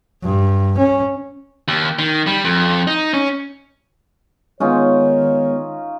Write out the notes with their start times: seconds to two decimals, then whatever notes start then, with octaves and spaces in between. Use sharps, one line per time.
0.23 G2
0.78 C#4
1.68 D#2
1.99 D#3
2.27 G3
2.45 F2
2.87 D#4
3.14 C#4
4.60 D#3 G#3 B3 C#4 D#4 F4 C#5